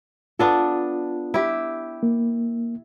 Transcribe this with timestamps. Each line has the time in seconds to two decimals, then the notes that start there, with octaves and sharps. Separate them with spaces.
0.39 B3 D4 F4 A4
1.34 E4 G4
2.03 A#3